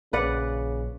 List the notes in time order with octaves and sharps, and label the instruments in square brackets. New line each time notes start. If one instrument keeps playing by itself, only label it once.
[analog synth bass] A#1 [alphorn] C#3 [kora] B4 D5 F#5